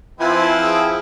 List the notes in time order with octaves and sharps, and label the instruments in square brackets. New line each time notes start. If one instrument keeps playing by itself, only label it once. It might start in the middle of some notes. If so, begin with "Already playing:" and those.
[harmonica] F3 C4 E4 [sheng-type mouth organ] F4 B4 G#5
[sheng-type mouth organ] G#4 G5